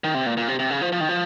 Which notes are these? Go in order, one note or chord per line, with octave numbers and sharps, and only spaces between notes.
D#3
C3
A#2
A#2
C3
C3
C#3
F3
F3
D#3
F3